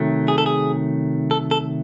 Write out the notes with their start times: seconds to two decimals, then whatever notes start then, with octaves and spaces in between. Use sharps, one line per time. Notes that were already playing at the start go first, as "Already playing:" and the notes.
Already playing: C3 D#3 F#3 A3
0.28 G#4
0.38 A4
0.46 G#4
1.31 A4
1.51 A4